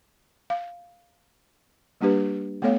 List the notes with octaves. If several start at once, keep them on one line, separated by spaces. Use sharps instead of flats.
F5
G3 A#3 D4 G4 B4
A3 B3 A4 C#5 F5